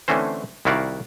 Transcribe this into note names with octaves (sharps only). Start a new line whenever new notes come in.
D3 E3 A3 C4 C#4 C5
C2 D#3 E4 F#4 D5 F5